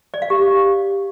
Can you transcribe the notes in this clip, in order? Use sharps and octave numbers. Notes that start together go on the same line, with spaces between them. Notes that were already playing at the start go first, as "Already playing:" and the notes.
D5
F5
G4